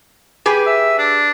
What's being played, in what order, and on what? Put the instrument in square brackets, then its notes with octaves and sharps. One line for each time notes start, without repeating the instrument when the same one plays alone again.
[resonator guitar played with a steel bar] G4 G#4 B4
[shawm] E5
D4